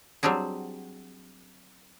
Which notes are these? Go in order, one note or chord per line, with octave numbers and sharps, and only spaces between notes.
F#3 G3 C4 D4 G#4